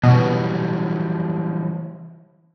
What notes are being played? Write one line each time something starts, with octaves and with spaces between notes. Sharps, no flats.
B2 E3 F#3 G3